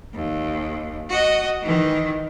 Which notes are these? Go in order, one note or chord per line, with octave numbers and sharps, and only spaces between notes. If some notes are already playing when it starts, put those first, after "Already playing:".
D#2
F#4 D#5
D#3 E3